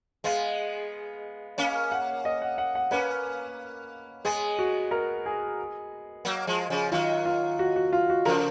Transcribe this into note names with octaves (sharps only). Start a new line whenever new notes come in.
G#3 B3 F5
A#3 C#4 F5
F#5
D#5
F#5
F#5
F#5
A#3 C#4 B4
G#3 B3 G#4
F#4
A#4
G#4
F#3 A#3
F3 G#3
C#3 F3
D#3 F#3 F4
F4
F#4
F#4
F4
F#4
C#3 F3 A#4